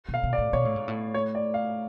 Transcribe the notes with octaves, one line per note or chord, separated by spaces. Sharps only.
B2
F5
B2
D5
A2
B2 C#5
A2
G#2
A2
C#5
D5
F5